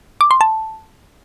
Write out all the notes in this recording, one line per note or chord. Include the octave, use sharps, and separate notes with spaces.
D6
C6
A5